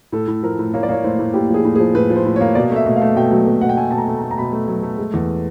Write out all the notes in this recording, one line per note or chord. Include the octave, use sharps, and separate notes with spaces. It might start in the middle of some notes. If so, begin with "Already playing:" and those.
A2 A4
A2
F3 A#4
A2
A#3 C#5
D5
A#3 C#5
A2 C5
A2
A2 G4
F3 G#4
A2
G#4
F3
A2 B4
F3
C5
A2
C#5
A#3
B2 D5
A3
E5
B2
F5
A3
B2 G5
F#3
B2
B2 F#5
G5
A3 G#5
B2 A5
A#5
A3
A#5
A3
A#5
B2 B5
A3
F#3
A3
G#3
E2